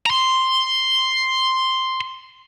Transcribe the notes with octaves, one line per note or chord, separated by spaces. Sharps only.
A#5 C6